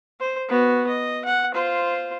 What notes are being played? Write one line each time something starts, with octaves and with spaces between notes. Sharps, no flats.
C5
B3 F#4
D#5
F#5
F4 C5